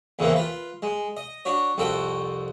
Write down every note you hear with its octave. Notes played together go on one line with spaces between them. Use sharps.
E2 A2 C#3 E3 A#3 C4
F4 B4
G#3
D#5
D4 F#4 C#5
C2 F2 F#4 A4 G5